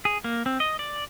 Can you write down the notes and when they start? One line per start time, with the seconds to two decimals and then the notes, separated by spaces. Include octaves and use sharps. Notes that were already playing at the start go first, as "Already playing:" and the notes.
0.05 G#4
0.24 A#3
0.46 C4
0.60 D#5
0.79 D5